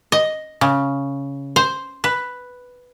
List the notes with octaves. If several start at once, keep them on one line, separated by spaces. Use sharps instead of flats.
D#5
C#3
C5
B4